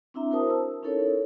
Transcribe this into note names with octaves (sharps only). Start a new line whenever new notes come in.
C4 D4 E4 E5 A#5
E4 F#4 A#4 C5 A5 D#6
E6
C#4 D#4 E4 A4 A#4 C#5